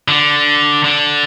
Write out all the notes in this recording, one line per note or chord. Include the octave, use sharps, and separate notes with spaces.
D3
D3